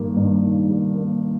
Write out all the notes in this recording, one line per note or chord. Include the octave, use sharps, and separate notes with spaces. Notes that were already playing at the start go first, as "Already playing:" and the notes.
Already playing: G2 D#3 G3 A#3
G2
D#3
G3
A#3